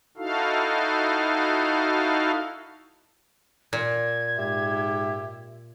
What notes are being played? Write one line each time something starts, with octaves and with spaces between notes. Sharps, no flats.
D#4 E4 F#4 A4 F5
A#2 G#6
G#2 G4 E5